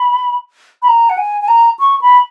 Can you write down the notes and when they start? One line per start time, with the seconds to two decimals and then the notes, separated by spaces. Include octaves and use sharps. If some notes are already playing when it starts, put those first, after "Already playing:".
Already playing: B5
0.82 B5
0.88 A#5
1.09 F#5
1.18 G#5
1.42 G#5
1.48 A#5
1.79 C#6
2.01 B5